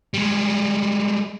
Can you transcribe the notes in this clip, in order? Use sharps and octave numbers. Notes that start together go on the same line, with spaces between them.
G3 G#3